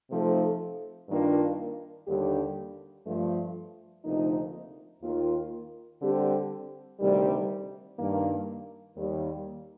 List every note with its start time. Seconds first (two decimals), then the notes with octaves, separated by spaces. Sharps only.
0.10 C3 F3 A3 D#4 A4
1.09 G2 D#3 A#3 D4 F4
2.07 D#2 D3 G3 D4 G4
3.06 G2 F3 A3
4.04 D2 C3 F3 A#3 D#4
5.03 D#2 D#3 A#3 F4
6.01 D3 G3 C4 G4
6.99 D2 C3 D#3 G3
7.98 G2 D#3 A#3
8.96 D#2 D#3 G3